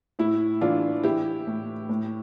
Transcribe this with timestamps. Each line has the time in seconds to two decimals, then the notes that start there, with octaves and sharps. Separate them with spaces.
0.19 A2 E4
0.61 E3 D4 F4
1.04 E3 E4 G4
1.47 A2
1.89 A2